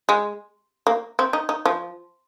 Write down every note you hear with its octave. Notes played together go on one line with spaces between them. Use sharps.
G#3
A#3
C4
D#4
D#4
F3